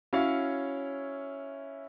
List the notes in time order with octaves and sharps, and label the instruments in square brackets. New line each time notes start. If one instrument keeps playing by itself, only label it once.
[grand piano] C#4 E4 F#4 C#5 F5